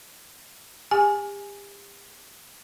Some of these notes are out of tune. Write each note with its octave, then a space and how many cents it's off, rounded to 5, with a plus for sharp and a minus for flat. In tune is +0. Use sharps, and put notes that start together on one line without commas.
G4 +40 G#5 +0